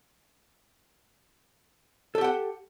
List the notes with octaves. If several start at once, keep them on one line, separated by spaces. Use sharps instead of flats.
G4 A4 F#5 G5